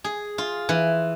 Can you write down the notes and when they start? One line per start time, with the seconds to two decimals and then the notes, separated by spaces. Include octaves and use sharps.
0.04 G#4
0.38 F4
0.69 E3